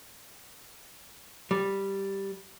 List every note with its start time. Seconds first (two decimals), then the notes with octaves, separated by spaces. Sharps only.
1.51 G3